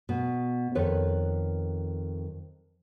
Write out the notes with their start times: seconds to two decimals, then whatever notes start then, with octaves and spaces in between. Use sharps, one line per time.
0.09 B2
0.75 F2 D#3 B4 C#5